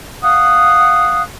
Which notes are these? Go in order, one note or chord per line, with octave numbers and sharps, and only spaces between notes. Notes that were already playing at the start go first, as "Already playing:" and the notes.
F5 F#5 D#6 F#6